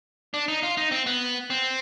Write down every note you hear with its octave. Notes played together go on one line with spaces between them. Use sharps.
D4
D#4
F4
D#4
C4
B3
C4